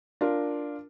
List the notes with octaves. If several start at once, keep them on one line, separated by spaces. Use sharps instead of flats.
D4 F4 A#4